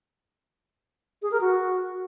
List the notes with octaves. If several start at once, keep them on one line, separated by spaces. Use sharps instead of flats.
G#4
A#4
F#4